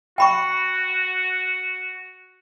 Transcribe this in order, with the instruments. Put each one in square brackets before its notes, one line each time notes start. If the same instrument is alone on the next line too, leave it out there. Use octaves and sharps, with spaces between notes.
[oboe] F#4 [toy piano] G5 B5 C#6